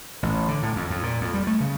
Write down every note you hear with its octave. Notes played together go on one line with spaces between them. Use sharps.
A1
D3
A2
F2
F2
A#2
F2
G3
A3
C#3